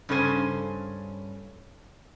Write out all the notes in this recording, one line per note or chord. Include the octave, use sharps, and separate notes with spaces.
G2 C#3 C#4 A4 C5 G#5